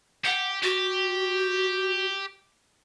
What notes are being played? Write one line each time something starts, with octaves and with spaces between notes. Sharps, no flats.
G4 F#5
F#4 G4